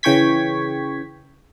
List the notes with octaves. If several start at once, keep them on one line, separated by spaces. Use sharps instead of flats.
C#3 E3 G5 C#6 G#6 B6